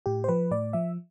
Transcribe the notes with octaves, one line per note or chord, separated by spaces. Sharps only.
A2 G4
C5
F3 B4
A2 D5
F3 E5